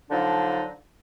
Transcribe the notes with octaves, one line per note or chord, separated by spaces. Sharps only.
D3 F3 F#3 D4 D#4